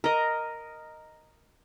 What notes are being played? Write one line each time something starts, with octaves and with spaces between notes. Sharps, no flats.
A#4 D#5